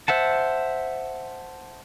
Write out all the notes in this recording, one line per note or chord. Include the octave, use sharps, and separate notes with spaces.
C5 E5 F#5 A5